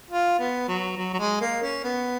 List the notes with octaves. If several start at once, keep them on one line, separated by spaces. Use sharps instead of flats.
F4
B3
F#3
F#3
F#3
G#3
A#3
C#4
B3